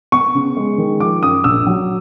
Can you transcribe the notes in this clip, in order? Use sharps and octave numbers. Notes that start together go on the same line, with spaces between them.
B3 C#6
C#3
G#3
D#3
F3 D6
F#2 D#6
A#1 E6
F#3